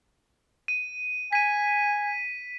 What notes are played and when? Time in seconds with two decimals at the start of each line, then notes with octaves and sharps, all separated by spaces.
0.68 D#7
1.33 G#5 B6 D#7